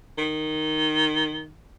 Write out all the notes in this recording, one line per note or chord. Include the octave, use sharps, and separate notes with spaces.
D#3